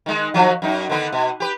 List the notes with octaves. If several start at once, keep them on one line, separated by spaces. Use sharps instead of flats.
D#3 G#3
D#3 F3 F#3
F#2 D#4
D3 D#3 B3
B2
G4 B4